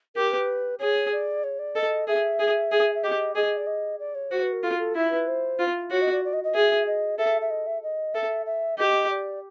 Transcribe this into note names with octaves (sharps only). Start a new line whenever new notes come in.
G4 A#4
B4
G#4 C#5
D5
C#5
D5
A4 D#5
G#4 E5
G#4
G#4
E5
G4 D#5
G#4 D#5
D5
D#5
D5
C#5
F#4 C5
B4
A#4
F4 A4
A4
E4
B4
C5
F4
F#4 C#5
D#5
D5
D5
D#5
D#5
G#4 E5
D#5
A4 E5
E5
D#5
E5
D#5
A4 E5
E5
G4 D#5
D5